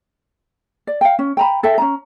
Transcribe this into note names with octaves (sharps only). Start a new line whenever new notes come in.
D5
F5 G5
C#4
G5 A#5 B5
A4 E5 G5
C#4 D4 A#5